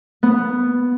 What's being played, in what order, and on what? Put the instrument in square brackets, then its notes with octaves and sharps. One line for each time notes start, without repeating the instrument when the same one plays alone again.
[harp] B3